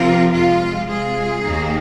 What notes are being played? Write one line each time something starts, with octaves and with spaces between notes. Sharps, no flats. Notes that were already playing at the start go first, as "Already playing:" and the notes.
Already playing: C3 F3 C4 F4 A#4
F2 C3 G#3 F4
C3 G#3 F4 G#4
D#2 D#3 A#3 D#4